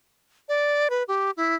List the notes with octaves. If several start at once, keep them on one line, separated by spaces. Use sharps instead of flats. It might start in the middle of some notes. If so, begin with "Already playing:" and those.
D5
B4
G4
E4